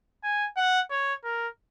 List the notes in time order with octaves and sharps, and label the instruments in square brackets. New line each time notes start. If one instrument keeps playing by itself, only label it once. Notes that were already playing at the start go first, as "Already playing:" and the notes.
[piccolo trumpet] G#5
F#5
C#5
A#4